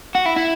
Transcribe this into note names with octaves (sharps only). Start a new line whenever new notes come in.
F#4
E4
E4